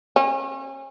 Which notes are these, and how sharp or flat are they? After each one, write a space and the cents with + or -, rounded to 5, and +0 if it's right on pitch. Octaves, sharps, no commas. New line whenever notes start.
C#4 -40